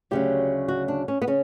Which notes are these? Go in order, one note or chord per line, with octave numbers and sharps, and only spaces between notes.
D2 C#3 F#3 G4
F#4
D4
C#4
B3
C#3 C#4